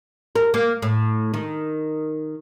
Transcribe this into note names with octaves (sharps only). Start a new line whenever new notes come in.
A#4
A#3
A2
D#3